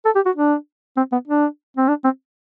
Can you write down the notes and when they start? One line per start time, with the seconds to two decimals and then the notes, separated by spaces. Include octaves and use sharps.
0.05 A4
0.15 G4
0.26 F#4
0.36 D4
0.97 C4
1.12 B3
1.27 D4
1.77 C4
1.88 D4
2.04 C4